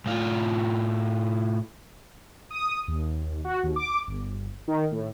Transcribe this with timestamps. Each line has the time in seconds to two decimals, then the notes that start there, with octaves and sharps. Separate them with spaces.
0.06 A2 F4
2.51 D#6
2.88 D#2
3.45 F#4
3.63 D#2
3.76 D6
4.07 G1
4.68 D#3
4.92 A2